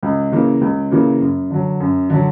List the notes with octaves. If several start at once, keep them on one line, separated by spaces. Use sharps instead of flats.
C#2
C#3 E3 A#3
C#2
C#3 E3 A#3
F#2
D3 F#3
F#2
D3 F#3